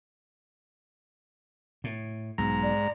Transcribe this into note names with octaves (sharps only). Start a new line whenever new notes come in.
A2
B1 G#2 A#5
D5